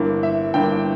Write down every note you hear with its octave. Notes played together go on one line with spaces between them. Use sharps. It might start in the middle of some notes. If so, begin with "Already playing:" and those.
Already playing: G1 G2 E3 A#3
E5
G1 G2 E3 A#3 G5